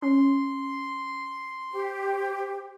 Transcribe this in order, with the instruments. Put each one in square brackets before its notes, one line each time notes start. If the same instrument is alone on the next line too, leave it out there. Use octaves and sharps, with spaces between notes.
[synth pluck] C#4 [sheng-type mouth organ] C6
[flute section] G4 C5